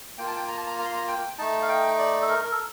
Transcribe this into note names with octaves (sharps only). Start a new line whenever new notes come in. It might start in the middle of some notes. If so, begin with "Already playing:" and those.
A#3 F4 G5
A5
G5
A#5
A5
A#5
A#5
C6
A#5
G5
A3 D#4 A5
F5
G5
D5
A4
A#4
A#4
A4